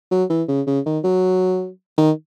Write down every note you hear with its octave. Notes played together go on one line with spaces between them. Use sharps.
F#3
E3
C#3
C#3
D#3
F#3
D#3